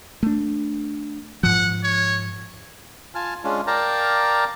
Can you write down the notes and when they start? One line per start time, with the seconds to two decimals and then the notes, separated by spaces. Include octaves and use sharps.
0.23 A3 D4
1.43 G#2 F3 F#5
1.83 C#5
3.15 F4 G#5 A5 F6
3.44 G#3 C#4 D4 F4
3.67 A#4 D5 F5 G5 A5 A#5